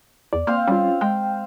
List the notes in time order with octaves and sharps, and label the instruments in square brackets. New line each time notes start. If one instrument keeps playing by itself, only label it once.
[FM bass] E2 [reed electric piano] D5
[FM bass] A#3 [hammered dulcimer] C4 C5 F5
[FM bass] G3 [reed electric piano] C#4 F4
[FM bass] G#3 [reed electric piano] G5